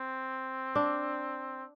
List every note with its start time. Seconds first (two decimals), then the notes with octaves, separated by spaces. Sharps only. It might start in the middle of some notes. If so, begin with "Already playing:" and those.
Already playing: C4
0.75 D4